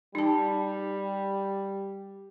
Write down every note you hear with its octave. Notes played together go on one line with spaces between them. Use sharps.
G3 D#4 A5